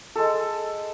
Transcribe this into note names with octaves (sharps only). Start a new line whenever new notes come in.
G#3 A4